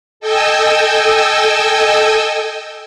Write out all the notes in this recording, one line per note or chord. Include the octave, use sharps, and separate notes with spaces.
A4 D#5 G5 G#5 E6